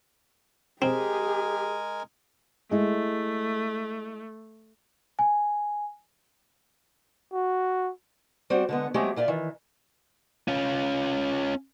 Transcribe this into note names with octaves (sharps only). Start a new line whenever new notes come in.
G#3 C4 G4 G#4 A#4 G#5
G#3 A3 E4
G#5
F#4
G3 C4 F#4 C5
D3 G#3 B3
F#3 G#3 A3 C4 G4 G#4
A#2 F4 D5 E5
D#3 E3
C#4 F4